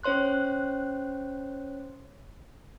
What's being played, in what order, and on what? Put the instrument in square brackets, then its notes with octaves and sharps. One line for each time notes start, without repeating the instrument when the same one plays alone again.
[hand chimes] C#4 C5 C#5 C6 F#6